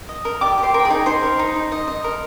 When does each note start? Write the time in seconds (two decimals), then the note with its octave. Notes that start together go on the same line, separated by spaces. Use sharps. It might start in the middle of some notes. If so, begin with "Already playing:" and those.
0.09 D#5
0.25 A#4
0.41 G4 D5 D6
0.58 G4
0.63 C5 C6
0.74 A#4
0.79 G5
0.85 G#4 G#5
0.90 D#4
1.06 D#4 C5 C6
1.23 A#4
1.39 D#4
1.56 D#4
1.72 D#5
1.88 D#5
2.04 A#4